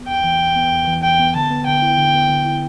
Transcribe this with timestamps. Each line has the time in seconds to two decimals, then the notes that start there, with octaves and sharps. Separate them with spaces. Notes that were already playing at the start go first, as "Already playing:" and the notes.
Already playing: B3
0.08 E2 G5
0.24 E3
0.40 E2
0.56 B3
0.72 E2
0.87 E3
1.03 E2 G5
1.20 B3
1.35 D3 A5
1.50 B3
1.66 D3 G5
1.82 E4
1.98 D3
2.14 B3
2.30 D3
2.46 E4